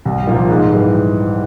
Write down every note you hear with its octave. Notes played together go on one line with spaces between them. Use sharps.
C2
A#2 F3 A#3
G#2
E3 G3